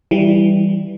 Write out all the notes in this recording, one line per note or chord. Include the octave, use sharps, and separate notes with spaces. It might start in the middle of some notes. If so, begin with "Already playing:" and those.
E3 G3